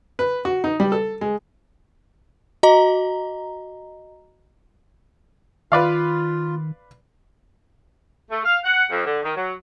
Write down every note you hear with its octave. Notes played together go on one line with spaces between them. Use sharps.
B4
F#4
D#4
G3
A4
G#3
F#4 D#5 A#5
D#3 F4 B4 D5 F5
A3
F5
F#5
F2
D3
D#3
F#3